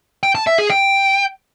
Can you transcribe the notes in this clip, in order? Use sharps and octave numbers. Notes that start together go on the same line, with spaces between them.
G5
A5
E5
G#4
G5